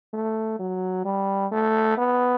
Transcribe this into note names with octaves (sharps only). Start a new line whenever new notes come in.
A3
F#3
G3
A3
B3